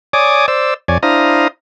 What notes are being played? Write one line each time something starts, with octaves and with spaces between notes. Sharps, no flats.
C#5 D5 G#5 D6 D#6
C5 D5 E6
F2 C#5 D5 G#5
D4 E4 C5 F5 A#5 D#6